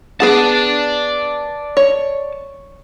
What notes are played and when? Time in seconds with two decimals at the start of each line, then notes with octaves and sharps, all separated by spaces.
0.20 B3 G#4 D5 F#5 A5
1.77 C#5